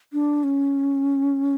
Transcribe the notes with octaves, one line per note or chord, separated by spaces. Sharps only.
D4
C#4